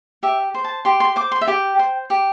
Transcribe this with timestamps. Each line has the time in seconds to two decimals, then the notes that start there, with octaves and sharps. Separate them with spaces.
0.23 G4 E5
0.54 C5
0.64 A5
0.85 G4 C6
1.00 C6
1.16 C5 D6
1.32 C6
1.41 E5
1.48 G4 G5
1.79 C5
2.10 G4